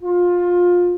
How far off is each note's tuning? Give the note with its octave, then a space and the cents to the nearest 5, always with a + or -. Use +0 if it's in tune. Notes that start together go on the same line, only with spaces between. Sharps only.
F4 +20